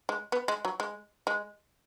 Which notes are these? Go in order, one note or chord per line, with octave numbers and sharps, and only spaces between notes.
G#3
B3
G#3
F#3
G#3
G#3